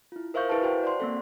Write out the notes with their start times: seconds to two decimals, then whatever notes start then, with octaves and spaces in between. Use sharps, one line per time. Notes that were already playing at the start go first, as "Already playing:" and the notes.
0.12 E4 F4
0.34 A#4 C5 E5 F5 C#6 G6
0.49 E4 G#4 B4 F5 A5
0.62 F#4 C5 F#5 G5
0.83 D5 F#5 C6
1.00 A#3 C4 A4